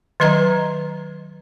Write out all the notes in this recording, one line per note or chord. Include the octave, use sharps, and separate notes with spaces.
D#3 F#3 B4 D#5 A#5